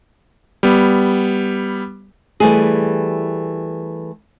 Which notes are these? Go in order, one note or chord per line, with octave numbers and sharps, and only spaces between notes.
G3 B3
E3 G3 A3 G#4